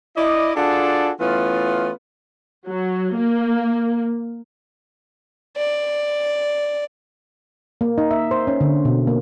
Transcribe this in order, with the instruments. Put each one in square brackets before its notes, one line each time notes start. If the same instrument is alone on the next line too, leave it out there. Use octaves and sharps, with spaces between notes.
[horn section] E4 D5 D#5
D4 F4 F#4 G#4 A4 D5
E3 A3 B3 C#4 F4
[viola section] F#3
A#3
[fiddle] D5
[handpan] A#3
D#4
E5
C5
C#4
D3
B2
A#3